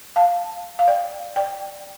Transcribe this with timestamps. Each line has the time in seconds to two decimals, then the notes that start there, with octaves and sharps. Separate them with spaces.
0.16 F5 A5
0.79 F5
0.88 D5 G5
1.36 D5 G5